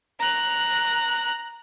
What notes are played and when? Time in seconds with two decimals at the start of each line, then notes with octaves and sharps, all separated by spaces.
0.20 A#5 F#6